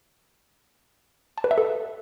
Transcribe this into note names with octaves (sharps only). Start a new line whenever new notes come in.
A5
B4
E5
A4